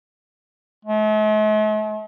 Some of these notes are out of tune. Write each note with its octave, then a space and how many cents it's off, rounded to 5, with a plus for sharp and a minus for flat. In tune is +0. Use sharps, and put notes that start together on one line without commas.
A3 -45